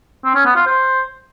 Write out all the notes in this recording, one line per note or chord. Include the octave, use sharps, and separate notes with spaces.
C4
C#4
B3
F4
C5